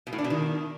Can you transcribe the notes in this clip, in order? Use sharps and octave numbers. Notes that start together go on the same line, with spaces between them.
B2
A2
D4
B2
D#3